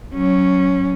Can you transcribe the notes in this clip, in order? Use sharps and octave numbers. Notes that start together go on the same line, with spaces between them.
F#3 C#4